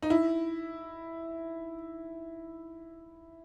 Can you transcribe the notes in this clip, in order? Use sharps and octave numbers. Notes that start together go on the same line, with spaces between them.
D#4
E4